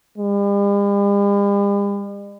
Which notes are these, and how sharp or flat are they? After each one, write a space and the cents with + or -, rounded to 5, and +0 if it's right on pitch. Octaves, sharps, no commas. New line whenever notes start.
G3 +45